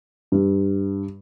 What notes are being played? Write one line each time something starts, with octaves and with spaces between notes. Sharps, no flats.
G2